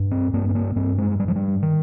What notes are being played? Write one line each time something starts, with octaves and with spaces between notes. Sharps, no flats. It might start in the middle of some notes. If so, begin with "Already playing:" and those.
Already playing: G2
C4
G2 A#3
C4
A#3
G2 C4
G#3
G2 G3
F3
G3
D#3